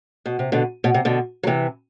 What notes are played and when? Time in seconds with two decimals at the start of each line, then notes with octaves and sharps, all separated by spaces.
0.26 B2
0.39 C3
0.52 B2 D3
0.84 B2
0.94 C3
1.05 B2 D3
1.43 F#3
1.47 C3 E3